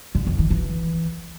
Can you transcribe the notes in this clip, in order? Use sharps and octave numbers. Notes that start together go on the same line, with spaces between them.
D3
F2
D#3
E3